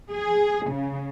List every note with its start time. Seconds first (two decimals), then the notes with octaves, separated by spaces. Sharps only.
0.11 G#4
0.68 C#3